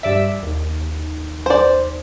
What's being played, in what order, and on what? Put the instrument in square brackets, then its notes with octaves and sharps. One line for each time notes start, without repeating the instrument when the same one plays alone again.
[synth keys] G2 D5 E5
D#2
[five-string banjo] C5 D5